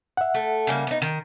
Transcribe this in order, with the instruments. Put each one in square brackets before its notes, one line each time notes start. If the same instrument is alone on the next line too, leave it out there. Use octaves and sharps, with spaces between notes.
[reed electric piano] E5 F#5
[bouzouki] A3
C#3 G3 A#3
B3 D#4
D#3